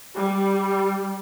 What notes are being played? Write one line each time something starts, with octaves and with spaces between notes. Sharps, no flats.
G3